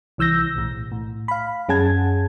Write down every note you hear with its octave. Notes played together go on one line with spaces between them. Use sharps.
C2 E3 E6 G6 A#6
B1 A2
A2
F5 B5
F#2 C#4 G#4 F#5 A5 G#6